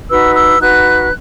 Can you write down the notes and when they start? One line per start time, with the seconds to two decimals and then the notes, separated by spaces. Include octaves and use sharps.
0.09 D#4 F#4 B4 E6
0.34 E6
0.59 D#4 F#4 B4 F#6